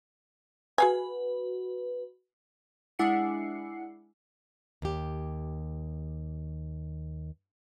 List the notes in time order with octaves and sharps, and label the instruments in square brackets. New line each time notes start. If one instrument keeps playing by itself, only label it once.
[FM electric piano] F#4 B4 [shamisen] G#4 F5 G#5
[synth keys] G#3 D4 E4 F#5 C7 C#7
[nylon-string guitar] D#2 G4